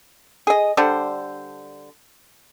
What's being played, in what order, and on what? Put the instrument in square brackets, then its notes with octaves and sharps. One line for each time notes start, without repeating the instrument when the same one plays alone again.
[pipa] G#4 D#5
D3 G3 D4 C5